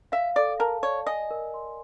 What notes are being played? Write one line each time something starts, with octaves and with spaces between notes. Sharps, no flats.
E5 F5
A4 D5
A#4 A5
C#5 D5
D#5 G#5
A#4
C6